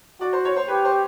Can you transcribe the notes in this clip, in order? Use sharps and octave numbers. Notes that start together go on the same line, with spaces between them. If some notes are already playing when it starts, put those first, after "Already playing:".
F#4 D5
C5
C#5
C5
G4 B4
C5